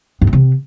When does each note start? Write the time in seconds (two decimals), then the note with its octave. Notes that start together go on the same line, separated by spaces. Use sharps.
0.22 G2
0.27 E3
0.33 C3